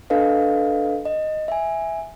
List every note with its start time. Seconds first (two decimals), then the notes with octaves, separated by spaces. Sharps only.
0.10 D4 A4 B4 D#5 F5
1.05 D#5
1.48 E5 G#5